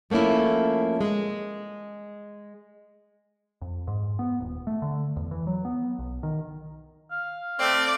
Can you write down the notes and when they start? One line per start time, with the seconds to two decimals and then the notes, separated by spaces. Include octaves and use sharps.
0.10 F3 A3 A#3 C#4 E4
1.01 G#3
3.62 F2
3.87 G#2
4.19 B3
4.40 D#1
4.67 A3
4.82 D3
5.17 E2
5.31 E3
5.47 F#3
5.65 B3
5.99 B1
6.23 D#3
7.11 F5
7.60 A3 C4 D5